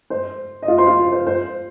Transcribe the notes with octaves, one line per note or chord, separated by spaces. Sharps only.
C5
D#5
F4 F5
C5 C6
F4 F5
C5
C5